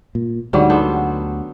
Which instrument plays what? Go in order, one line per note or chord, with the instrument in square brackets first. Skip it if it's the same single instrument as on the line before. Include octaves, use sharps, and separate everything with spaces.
[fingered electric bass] A#2
[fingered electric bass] D2 D3 [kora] G#2 F#3 G3
[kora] B3 A4 C5